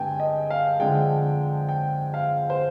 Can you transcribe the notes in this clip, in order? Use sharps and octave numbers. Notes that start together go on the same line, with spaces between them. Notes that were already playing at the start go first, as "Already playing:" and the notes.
Already playing: G2 D3 G#3 C4 G5 G#5
D#5
F5
F2 D3 G#3 G5
G5
F5
C5